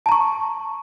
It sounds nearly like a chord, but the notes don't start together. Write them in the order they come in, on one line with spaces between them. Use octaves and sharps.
A5 A#5 C#6